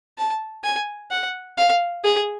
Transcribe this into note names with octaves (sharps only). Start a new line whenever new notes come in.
A5
G#5
F#5
F5
G#4